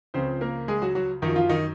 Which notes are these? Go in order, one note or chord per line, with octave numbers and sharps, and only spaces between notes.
C#2 C#3 F3 C4 C5
A#3 A#4
G#3 G#4
F#3 F#4
F#3 F#4
F#2 D#3 F3 D#4
F3 F4
D#3 D#4